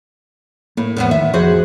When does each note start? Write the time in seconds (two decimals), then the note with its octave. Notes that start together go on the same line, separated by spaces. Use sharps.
0.77 A2 A#3
0.97 E1 A2 F3 B3
1.11 D#3 E5
1.34 A1 F2 F3 F#4 G#4 C5